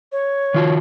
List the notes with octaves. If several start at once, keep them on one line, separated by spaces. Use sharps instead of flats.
C#5
D#3 F4 F#4